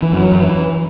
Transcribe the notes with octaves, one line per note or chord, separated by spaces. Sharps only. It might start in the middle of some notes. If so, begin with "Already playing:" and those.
E3
F#2
F#3
F#2
E3